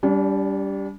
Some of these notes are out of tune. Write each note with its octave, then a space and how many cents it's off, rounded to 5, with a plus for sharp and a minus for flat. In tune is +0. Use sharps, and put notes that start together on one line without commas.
G3 +0 D4 -40